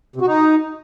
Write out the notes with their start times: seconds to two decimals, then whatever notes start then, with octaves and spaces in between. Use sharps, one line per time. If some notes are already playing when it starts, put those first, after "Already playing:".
0.16 C3
0.21 F#4
0.27 D#4